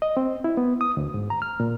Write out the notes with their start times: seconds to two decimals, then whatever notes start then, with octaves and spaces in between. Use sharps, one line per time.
0.02 D#5
0.17 C4
0.44 E4
0.57 B3
0.81 D#6
0.97 D2
1.14 G#2
1.30 A#5
1.42 F6
1.60 A#2